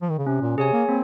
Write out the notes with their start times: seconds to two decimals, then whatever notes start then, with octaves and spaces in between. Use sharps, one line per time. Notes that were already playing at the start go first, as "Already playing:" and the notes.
0.02 F3
0.10 D#3
0.18 C#3
0.26 C3 C#4
0.42 A#2
0.57 C3 G#4 C#5 G#5
0.73 A#3
0.89 A#3 C4